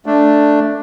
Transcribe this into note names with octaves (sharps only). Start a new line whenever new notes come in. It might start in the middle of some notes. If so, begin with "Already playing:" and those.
A3 D4